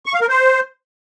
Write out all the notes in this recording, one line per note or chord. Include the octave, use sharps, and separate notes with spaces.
C#6
F5
A#4
C5